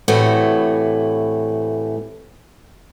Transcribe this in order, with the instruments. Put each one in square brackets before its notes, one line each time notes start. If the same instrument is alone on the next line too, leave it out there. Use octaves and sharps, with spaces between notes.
[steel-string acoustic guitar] A2 C3 E3 A3 E4 F#4